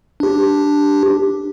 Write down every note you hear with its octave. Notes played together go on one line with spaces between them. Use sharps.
D4 G4